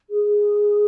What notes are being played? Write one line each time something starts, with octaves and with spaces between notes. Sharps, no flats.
G#4